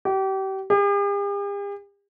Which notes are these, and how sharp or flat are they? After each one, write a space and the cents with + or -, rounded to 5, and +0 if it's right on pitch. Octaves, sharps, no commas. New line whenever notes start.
G4 -35
G4 +45